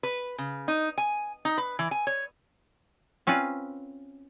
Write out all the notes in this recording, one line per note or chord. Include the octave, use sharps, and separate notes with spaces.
B4
C#3
D#4
G#5
D#4
B4
E3
G#5
C#5
C4 C#4 F4 B4